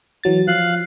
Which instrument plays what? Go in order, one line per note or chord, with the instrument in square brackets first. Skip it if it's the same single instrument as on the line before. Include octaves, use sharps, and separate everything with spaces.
[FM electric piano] E3 F#3 A6
[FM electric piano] F3 [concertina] F5 F#6